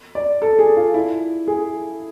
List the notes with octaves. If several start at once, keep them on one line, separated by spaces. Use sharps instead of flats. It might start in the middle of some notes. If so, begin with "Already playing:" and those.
D5
A4
G#4
F4
E4
G#4